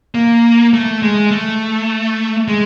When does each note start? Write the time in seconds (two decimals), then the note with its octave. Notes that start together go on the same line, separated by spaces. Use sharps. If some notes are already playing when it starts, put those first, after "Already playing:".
0.15 A#3
0.74 A3
1.02 G#3
1.31 A3
2.48 G#3